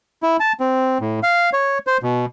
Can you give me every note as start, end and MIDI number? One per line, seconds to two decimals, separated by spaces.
0.23 0.37 64
0.40 0.53 81
0.60 0.98 60
1.01 1.20 45
1.23 1.50 77
1.53 1.78 73
1.87 1.98 72
2.03 2.25 47